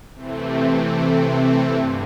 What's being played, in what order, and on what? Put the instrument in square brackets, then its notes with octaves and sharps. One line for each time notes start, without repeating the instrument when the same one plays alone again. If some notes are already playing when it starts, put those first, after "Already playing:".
[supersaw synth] C3 E3 A3 C4
G2 D3